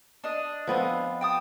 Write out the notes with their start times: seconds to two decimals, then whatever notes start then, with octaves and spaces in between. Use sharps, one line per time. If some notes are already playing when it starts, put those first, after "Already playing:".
0.24 D4 D#5
0.67 F3 B3 C4
1.21 G5 A5 D#6